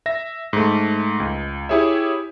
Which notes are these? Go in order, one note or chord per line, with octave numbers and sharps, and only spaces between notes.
E5 A#6
G#2 A3
C#2
E4 G4 G#4 C#5 E5